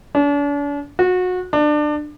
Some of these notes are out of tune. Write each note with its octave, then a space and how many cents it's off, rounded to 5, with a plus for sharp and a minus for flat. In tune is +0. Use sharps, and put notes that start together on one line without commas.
D4 -40
F#4 -25
D4 +25